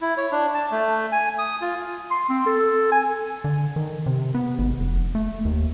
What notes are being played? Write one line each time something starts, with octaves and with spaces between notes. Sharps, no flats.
E4
C#5
D4
A5
A3
G#5
D#6
F4
C6
C4
A4
G#5
D3
D#3
C3
B3
G#1
F1
A3
D#2